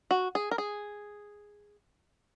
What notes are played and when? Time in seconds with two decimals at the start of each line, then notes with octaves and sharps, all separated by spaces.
0.11 F#4
0.35 G#4
0.51 A#4
0.58 G#4